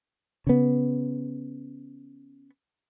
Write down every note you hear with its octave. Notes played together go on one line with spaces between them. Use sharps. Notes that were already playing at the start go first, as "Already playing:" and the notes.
C#3 B3